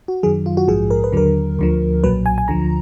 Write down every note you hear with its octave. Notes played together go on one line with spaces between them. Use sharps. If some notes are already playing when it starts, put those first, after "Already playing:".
F#4
F#2 D#3 F#3 G#4
F4
F#4
A#1 G#2 F3 G#4
A#4
B4
D#2 D3 F#3 A#4
D2 D3 F3
B1 A#2 F#3 B4
G#5
G#5
D2 D3 F3 A#5